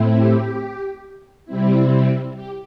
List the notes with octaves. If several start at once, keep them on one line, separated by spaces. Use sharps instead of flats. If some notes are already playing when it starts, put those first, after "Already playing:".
Already playing: A2 A3 C4 E4
G4
C3 G3 C4 E4
G4